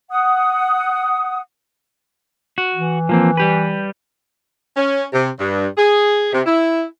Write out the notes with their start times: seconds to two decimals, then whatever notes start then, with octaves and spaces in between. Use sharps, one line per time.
0.10 F#5 D#6
2.58 F#4
2.74 E3
3.09 F3 A#3 C4
3.37 G3 G4 B4
4.77 C#4
5.13 C3
5.39 G2
5.77 G#4
6.33 C3
6.46 E4